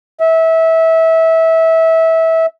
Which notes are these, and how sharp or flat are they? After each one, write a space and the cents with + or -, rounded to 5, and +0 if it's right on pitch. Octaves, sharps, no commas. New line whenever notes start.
E5 -20